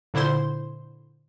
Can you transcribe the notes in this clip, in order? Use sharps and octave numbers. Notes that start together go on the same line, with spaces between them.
A#2 D3 E4 C5 C6